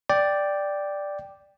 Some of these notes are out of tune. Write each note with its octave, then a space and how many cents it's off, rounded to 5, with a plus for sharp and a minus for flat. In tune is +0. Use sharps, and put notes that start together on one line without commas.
D5 +0 G5 +0